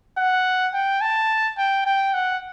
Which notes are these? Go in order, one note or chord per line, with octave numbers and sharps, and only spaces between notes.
F#5
G5
A5
G5
G5
F#5